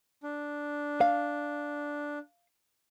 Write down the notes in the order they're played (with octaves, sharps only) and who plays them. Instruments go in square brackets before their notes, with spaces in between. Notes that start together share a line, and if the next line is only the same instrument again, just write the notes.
[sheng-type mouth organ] D4
[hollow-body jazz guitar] F5